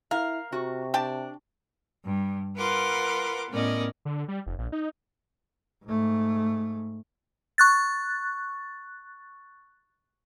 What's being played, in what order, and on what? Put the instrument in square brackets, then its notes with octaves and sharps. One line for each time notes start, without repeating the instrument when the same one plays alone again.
[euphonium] E4 [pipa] A#4 [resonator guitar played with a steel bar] F5
[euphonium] C3 [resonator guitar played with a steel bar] F#4
[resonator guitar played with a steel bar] D4 [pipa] G4 G5 A5
[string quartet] G2
F4 A#4 B4 F#5 C6 D6
A2 B3 C#4 A#4 D5 D#5
[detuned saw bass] D3
G3
F1
A#1
D#4
[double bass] G#2 A3
[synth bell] C#6 F#6 A6